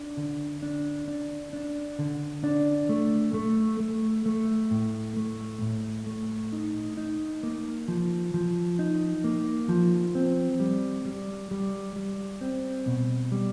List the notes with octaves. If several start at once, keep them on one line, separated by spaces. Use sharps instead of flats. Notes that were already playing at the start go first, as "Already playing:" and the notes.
Already playing: D4
D3
D4
D4
D4
D3
D4
A3
A3
A3
A3
A2
A3
A2
A3
D#4
D#4
A#3
F3
F3
D#4
A#3
F3
C4
G3
G3
G3
G3
C4
B2
G3